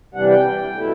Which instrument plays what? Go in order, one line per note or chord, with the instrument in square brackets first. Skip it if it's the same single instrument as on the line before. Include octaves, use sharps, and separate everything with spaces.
[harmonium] C3 E3 G3 D4 F#5
G5
B2 A3 E4